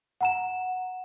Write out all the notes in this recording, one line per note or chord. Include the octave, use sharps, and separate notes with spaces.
F#5 A#5 E7